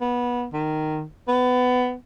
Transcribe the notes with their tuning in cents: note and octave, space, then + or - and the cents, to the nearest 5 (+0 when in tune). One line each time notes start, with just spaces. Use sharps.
B3 -20
D#3 -10
B3 +20